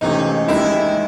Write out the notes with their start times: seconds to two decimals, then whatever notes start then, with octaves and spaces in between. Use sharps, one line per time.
0.01 C#2 C3 E3 A3 C#4 D#4
0.48 D#2 D#3 G#3 E4